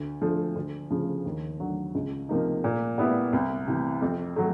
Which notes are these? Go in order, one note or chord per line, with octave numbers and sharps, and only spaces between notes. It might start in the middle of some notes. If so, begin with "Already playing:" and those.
Already playing: D2
D3 F3 A3
D2
C#3 F3
D#2
D3 F#3
C#2
C3 F3 A#3 D#4
A#2
G3 B3 E4
C2
C3 E3
F2
F#3 A3